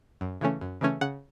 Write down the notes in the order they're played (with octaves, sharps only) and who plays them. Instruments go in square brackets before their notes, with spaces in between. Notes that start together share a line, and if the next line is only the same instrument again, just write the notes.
[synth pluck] F#2
C#3 E3 A3 C#4
F#2
C#3 E3 A3 C#4
C#3 F#5